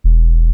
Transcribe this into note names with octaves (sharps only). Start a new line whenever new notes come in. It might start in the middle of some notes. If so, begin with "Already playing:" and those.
E1